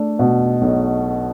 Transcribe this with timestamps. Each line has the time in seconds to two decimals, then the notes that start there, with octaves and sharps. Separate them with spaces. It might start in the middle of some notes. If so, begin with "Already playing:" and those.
Already playing: A3 D4
0.19 B2
0.61 B1